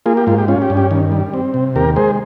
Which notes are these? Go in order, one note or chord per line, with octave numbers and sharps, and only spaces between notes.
A#3 F4 G#4
G4
G#2 F4
G4
C#4 F4
G4
G2
G4
D#3
G3
C4
C3
D#2 G4 A#4
G#3 G#4 C5